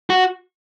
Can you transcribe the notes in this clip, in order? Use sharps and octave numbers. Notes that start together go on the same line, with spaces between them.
F#4